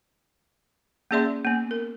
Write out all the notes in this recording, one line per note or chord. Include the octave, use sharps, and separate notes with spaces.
A#3 C#4 G#4 D5 E5 C6
A#3 B3
A#4